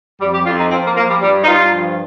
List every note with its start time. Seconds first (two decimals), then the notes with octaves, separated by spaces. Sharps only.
0.20 F2 G3
0.33 G4
0.45 F2 F4
0.58 D#4
0.71 F3 C4
0.84 A#3
0.96 F3 A#3
1.09 G3
1.22 G2 G3
1.44 D#4
1.48 G2 F4
1.73 F3